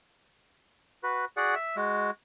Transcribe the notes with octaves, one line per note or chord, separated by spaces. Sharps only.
F#4 B4
F#4 G#4 D5 F#5
E5
G#3 F#4